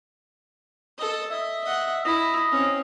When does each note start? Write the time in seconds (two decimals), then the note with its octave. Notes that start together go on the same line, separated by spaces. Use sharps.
0.98 A4 D#5
1.31 D#5 E5
1.64 D#5 F#5
2.05 E4 D#5
2.51 C4 C#4